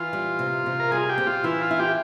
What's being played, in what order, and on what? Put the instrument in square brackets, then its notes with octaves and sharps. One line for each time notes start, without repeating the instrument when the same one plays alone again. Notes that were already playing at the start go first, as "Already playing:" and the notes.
Already playing: [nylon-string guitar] E3 [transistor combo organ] F4
[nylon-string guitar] G3
C3
C3
[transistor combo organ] A#4
[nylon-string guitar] G3 [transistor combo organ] G#4
[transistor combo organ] G4
[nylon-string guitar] C4
[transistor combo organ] F4
[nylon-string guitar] E3 [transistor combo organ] E4
[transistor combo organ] F4
[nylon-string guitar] E4
[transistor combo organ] G4